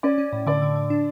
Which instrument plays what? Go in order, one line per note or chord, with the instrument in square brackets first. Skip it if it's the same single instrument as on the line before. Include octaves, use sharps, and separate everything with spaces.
[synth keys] C#4 [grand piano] D5
[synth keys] C#4
A2
[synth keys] D3 [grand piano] D5
[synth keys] D3
D3
D4